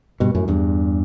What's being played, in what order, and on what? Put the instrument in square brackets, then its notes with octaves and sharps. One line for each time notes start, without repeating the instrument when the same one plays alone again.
[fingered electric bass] G2 B2
F#2 A2
E2 G2